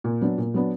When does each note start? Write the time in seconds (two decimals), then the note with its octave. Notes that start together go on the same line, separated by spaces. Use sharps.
0.04 A#2
0.21 F#3 B3 D4
0.38 A#2
0.54 F#3 B3 D4